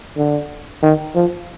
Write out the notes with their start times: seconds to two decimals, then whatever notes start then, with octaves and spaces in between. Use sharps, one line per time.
0.17 D3
0.83 D#3
1.15 F3